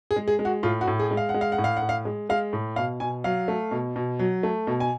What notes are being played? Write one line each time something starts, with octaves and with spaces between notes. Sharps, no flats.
G#4
G#3
G#4
G#3
F#4
A2 F4
F#4
A2
G#4
G#3
F5
F#5
G#3
F5
F#5
A2
F5
F#5
A2
F5
G#3
G#3 F5
A2
B2 F5
B2 G#5
F#3 F5
A3
B2
B2
F#3
A3
B2
G#5